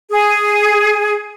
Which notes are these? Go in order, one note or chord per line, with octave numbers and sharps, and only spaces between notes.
G#4